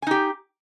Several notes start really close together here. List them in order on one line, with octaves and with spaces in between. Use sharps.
G#5 D#4 G4